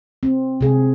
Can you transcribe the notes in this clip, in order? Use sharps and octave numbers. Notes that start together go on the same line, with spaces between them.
C4
C3 G#4